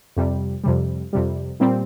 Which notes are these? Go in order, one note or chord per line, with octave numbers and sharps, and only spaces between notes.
F2 C3 G3
F2 C3 G3
F2 C3 G3
A#2 G3 C4